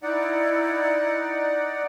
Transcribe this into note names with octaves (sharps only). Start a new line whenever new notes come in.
D#4 E4 D5 F#5